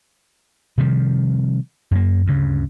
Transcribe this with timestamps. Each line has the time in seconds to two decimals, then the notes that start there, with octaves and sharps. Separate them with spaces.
0.78 C3 D#3 F3 G3
1.91 F#2 A#3
2.26 D2 G2 C#3